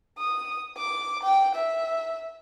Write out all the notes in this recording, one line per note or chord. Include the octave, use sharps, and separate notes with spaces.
D#6
D6
G5
E5